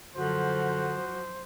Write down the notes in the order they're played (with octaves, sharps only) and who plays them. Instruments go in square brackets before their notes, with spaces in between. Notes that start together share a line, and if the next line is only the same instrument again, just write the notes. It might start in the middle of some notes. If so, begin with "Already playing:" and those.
[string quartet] F#2 F3 [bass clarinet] D3 [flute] F#4 [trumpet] C5